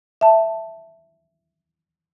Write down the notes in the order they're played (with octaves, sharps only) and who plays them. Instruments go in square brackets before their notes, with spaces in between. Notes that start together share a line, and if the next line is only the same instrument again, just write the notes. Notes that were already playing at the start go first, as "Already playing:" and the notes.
[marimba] E5 A5